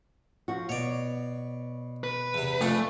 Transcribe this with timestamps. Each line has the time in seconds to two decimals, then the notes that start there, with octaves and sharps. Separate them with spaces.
0.48 F3 F#4
0.69 B2 C#5 D5
2.04 B4
2.34 E2 C3
2.61 F2 A3 D4 F4 G#5